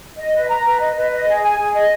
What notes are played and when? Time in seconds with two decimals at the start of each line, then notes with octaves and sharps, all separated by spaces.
0.18 D#5
0.33 B4
0.48 A#5
0.65 B4
0.80 D#5
0.96 B4
1.11 D#5
1.27 G#4
1.43 G#5
1.59 G#4
1.74 D#5